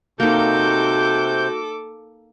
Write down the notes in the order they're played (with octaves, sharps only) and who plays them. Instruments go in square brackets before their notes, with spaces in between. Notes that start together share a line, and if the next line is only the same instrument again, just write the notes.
[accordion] C3 G6 [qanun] A#3 D#4 [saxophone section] F#4 [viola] A4 D6